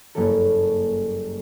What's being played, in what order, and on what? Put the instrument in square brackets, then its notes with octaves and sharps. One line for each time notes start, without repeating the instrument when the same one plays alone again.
[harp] F#1 G2 F#3 A#3 C#4 A4